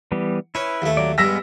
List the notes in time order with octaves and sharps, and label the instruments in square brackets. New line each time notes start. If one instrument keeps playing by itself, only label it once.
[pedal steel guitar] E3 G3 B3
[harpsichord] C#4 [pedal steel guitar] E4 B4
[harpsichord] D#2 A3
[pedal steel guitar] F#3 D5
[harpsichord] G2 G3 [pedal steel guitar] G#3 B3 F6 [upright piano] E6 A#6 B6